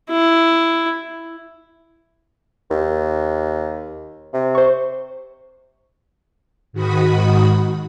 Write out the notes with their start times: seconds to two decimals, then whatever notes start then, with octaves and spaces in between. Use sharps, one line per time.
0.10 E4
2.70 D#2
4.33 C3
4.55 C5 C#6
6.73 G#2 D#3 F#4 B5 D#6